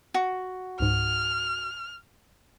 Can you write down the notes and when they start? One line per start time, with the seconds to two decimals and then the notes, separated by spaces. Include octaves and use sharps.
0.14 F#4
0.80 C#2 G#2 F6